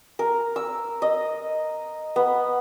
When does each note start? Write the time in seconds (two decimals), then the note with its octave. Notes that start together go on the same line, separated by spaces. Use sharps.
0.19 A#4
0.56 E6
1.02 D#5
2.16 B3